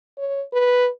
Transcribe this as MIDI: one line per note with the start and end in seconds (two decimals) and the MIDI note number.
0.18 0.43 73
0.53 0.89 71